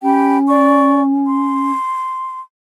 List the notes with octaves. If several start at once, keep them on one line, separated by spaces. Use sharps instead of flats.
C#4 G4 G5 B5
D5 C#6
C6